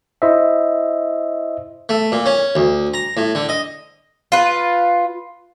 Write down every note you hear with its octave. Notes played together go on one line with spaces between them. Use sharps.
E4 C5 D#5 E5
A3
A#2
C#4
D2
A#5
A2
D3
D#5
F4 B4